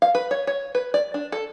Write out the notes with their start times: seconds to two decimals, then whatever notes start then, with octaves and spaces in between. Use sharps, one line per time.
0.02 F5
0.15 B4
0.31 C#5
0.47 C#5
0.75 B4
0.94 D5
1.14 D4
1.32 A4